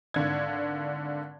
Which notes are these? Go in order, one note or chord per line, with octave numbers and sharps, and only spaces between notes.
G#1 D3 G#6